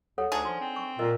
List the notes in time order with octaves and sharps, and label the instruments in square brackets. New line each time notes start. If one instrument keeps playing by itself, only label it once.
[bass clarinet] D#2 [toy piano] A4 C#5 F#5
[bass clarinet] D2 [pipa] D4 D#4 G#4
[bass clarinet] F3 [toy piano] C6
[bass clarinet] C4
[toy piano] C#6
[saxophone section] A#2 [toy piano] A#4 D#5